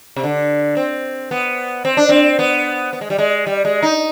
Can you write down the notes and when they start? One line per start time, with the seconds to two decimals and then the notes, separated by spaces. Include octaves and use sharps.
0.16 C3
0.23 D3
0.77 C4
1.31 B3
1.85 C4
1.97 D4
2.09 C4
2.39 B3
2.93 B3
3.01 G#3
3.10 G3
3.18 G#3
3.47 G3
3.65 G#3
3.82 D#4